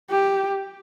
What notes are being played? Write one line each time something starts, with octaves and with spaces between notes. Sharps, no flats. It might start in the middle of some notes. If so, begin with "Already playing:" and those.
G4